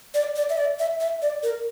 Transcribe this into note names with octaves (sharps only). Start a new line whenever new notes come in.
D5
D5
E5
D5
E5
E5
D5
A#4